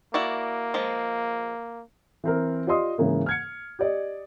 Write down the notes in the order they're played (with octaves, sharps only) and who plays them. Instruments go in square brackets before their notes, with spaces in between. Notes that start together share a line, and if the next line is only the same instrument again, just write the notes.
[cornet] A#3 [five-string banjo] E4 F#4 D5
[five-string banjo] F3 G#3
[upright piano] E3 C4 A#4
F4 G4 D5 D#5 C6 D#6
G#2 C#3 E3 A#3
F6 G#6 C#7
G4 D5 D#5